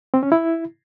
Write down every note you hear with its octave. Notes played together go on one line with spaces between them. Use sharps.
C4
C#4
E4